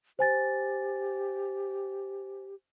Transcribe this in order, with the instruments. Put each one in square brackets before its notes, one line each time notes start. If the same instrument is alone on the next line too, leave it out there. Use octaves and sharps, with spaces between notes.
[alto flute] G4 [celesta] C5 G#5 A6